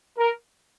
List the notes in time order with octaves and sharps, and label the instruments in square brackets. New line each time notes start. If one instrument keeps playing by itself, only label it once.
[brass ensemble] A#4